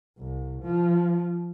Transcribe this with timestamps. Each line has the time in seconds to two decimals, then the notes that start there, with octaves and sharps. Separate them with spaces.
0.18 C2
0.63 F3